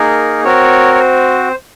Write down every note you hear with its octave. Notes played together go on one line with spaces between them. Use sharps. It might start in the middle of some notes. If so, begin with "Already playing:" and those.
Already playing: A#3 D#4 G#4 A#4
C4 F#4 A#4 C#5
C#5
C5